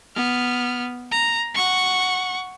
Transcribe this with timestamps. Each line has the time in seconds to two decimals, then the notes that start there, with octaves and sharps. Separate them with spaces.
0.15 B3 F6
1.12 A#5
1.55 F#5 C#6